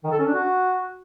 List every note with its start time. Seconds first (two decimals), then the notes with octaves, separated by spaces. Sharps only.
0.04 D#3
0.11 A4
0.19 C#4
0.27 D4
0.34 F#4